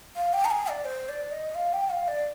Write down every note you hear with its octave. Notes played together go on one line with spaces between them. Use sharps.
F5
G5
A#5
G#5
D5
C5
D5
D#5
F5
G5
F5
D5